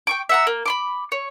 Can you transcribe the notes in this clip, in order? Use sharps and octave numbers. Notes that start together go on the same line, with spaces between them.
G5 C#6 D6
E5 F#5 A#5
A#3
B5 C6 D6
C#5